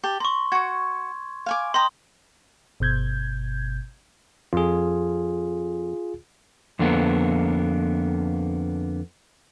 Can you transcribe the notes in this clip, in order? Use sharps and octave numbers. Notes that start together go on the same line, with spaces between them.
G4 A5
A#5 C6 C#6
F#4 C#6 G#6
F5 G#5 D6
D#5 G5 A#5 C6 D#6
G1 B2 G6 G#6
F2 F4 G#4
F2 D3 A#3 B3